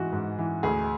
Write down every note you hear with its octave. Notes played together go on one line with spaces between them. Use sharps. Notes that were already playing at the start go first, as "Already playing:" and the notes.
Already playing: G#2 E3 F#4
G#2
E3
D2 G#4